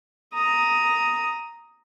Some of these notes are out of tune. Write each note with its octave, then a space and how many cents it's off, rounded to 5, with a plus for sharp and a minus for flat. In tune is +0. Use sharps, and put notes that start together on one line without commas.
A#5 +0 D#6 +10